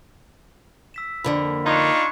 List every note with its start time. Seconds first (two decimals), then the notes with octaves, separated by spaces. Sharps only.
0.94 E6 B6 E7
1.24 F2 D3 A#3 B5
1.66 D4 D#4 F4 C6 C#6 G#6 F7